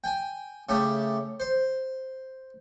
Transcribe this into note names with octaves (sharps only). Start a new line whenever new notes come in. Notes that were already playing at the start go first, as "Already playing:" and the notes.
G5 G#5
C#3 A3 G4
C5